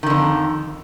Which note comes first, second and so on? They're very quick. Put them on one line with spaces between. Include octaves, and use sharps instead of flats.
D#3 D3 F2